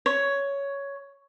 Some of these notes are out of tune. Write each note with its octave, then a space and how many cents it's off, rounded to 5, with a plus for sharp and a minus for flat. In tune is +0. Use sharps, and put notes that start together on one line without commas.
C#5 +10